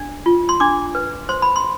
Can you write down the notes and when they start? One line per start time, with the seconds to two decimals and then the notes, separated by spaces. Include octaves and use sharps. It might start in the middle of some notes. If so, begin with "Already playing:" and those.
Already playing: D4
0.26 F4
0.49 C6
0.60 D4 D6
0.95 B4
1.29 C5 C6
1.42 B5
1.56 C6